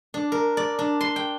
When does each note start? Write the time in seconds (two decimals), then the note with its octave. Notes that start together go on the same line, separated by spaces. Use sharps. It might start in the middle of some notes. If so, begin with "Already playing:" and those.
0.14 D4
0.32 A#4
0.57 D5
0.79 D4
1.01 C6
1.16 G5